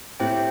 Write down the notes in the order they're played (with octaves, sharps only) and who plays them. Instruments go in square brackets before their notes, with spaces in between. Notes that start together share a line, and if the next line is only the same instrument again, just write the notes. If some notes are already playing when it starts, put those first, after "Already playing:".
[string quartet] A2 [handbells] C4 E4 G4 C5 G5